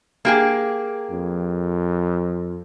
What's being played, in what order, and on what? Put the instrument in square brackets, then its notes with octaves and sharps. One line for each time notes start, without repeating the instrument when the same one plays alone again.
[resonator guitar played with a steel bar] A#3 G4 G#4
[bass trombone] F2